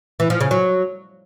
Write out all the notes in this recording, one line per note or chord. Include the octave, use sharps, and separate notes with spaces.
E3
F3
C#3
F#3